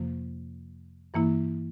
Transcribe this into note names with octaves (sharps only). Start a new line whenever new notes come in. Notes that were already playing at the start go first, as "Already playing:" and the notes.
Already playing: F2 C3 F3 A#3
G2 E3 A#3 E4